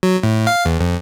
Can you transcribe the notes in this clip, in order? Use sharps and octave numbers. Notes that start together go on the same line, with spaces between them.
F#3
A2
F5
E2
F2